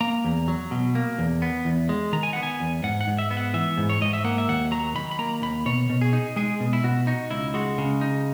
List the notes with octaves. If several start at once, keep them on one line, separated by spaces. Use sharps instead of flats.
A#3 A#5
E2
F#3
B2
A#3
E2
B3
E2
G#3
D#3 A#5
G#5
B3 F#5
G#5
E2
G#2 F#5
F#5
G#2
E5
B3
F#5
E3 E5
G#2
C#5
G#2 D#5
E5
A#3 F#5
E5
D#2 F#5
F#3 A#5
D#3 B5
B5
A#3 A#5
D#2 B5
B2 C#5
B2
G#4
D#4
G#3 G#4
B2
E4
B2 F#4
D#4 F#4
C#2 E4
G#3 F#4
C#3
D#4